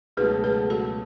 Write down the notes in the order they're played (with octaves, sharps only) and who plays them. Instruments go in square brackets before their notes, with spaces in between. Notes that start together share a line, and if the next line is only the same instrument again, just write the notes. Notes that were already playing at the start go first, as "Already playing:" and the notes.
[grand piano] C#2 B2 F#3 A3 [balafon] G#4 B4
[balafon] G#4 B4
F#4 A4